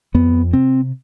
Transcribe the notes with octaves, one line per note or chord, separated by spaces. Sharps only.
F2 B3
C3 C4